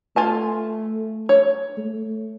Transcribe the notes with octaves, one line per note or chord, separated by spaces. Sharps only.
A3 F4 G#5 A5
C#5
A3